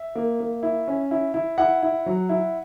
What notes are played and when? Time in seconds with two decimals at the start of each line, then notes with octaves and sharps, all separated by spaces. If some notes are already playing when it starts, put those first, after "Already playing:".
Already playing: E5
0.15 A#3
0.40 A#3
0.63 E4
0.87 C#4
1.11 E4
1.34 E4
1.58 E4 F#5
1.83 E4
2.06 F#3
2.29 E4